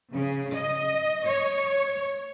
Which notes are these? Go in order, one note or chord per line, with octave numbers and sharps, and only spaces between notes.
C#3
D#5
C#5